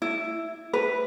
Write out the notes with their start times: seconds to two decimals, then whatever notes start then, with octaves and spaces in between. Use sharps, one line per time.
0.02 E4
0.73 B4